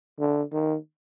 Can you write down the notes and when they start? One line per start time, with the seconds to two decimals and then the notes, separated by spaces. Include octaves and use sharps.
0.19 D3
0.52 D#3